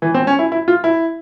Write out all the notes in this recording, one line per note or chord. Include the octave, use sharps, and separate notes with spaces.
E3
C4
C#4
E4
E4
F4
E4